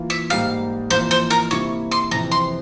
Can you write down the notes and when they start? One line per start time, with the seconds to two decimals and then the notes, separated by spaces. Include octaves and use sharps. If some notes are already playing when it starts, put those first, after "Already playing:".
Already playing: E3 A#3 F4
0.10 E5
0.30 G#2 G3 A#3 F5
0.90 F2 E3 A#3 F4 C5
1.11 C5
1.30 A#4
1.51 C3 G3 A#3 E4 C#5
1.91 C6
2.11 F2 C3 E3 A#5
2.31 C6